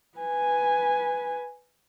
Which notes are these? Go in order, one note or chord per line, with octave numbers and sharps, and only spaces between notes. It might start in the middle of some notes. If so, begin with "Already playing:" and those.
B4 G#5